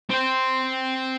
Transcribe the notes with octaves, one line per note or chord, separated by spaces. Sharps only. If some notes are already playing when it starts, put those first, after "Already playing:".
C4 C5